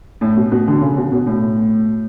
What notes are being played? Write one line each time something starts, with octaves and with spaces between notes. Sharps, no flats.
A2
B2
B2
D3
C#3
B2
B2
A2